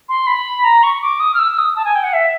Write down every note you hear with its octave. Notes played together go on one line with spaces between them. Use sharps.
C6
B5
A#5
C#6
D6
D#6
F6
E6
D#6
A5
G#5
G5
F#5
E5